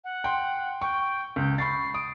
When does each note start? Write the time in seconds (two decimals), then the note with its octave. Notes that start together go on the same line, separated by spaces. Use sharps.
0.04 F#5
0.24 G5 C6
0.81 G5 C#6
1.36 C#2 G6
1.58 B5 C#6 A6 C7
1.94 D#6 D7